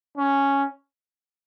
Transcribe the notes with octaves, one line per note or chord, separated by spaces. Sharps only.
C#4